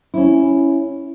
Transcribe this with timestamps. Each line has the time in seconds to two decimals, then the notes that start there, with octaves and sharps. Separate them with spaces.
0.14 C#4 E4